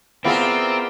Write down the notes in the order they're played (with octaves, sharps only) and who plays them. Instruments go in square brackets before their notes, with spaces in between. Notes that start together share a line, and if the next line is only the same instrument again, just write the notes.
[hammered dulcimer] B3 [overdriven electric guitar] C4 [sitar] E4 F4 G#4 [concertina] A#4 D5 E5